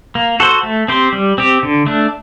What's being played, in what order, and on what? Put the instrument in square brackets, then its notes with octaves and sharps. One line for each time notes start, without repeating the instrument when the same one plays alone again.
[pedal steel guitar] A#3
F#4 A4 C5
A3
C4 G4 C5
G3
C4 G4
D3
A3 D4